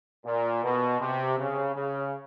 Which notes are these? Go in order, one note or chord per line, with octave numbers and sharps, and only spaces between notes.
A#2
B2
C3
C#3
C#3